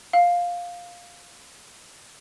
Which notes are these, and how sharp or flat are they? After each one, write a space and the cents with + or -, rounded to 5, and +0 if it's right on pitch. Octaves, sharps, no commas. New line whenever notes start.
F5 +10